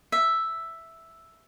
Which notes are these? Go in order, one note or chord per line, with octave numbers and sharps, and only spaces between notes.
E5